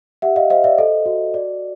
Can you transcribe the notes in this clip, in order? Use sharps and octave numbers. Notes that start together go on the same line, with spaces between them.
G4 E5 F#5
D#5 F5
C5 D#5 F5
D5 E5
A4 D#5
F#4
F#4 D5